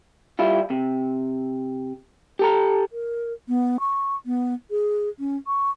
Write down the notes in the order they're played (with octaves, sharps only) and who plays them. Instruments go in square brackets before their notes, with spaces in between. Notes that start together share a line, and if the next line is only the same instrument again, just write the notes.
[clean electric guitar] G3 E4 F4
C3
G4 A4 A#5
[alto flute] A#4
B3
C#6
B3
G#4
C#4
C#6